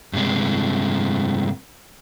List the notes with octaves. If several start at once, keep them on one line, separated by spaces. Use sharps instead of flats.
G2 C3 G#3